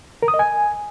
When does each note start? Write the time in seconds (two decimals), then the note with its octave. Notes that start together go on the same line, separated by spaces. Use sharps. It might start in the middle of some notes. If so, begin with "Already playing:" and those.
0.23 A#4
0.28 D#6
0.34 D#5
0.39 G#5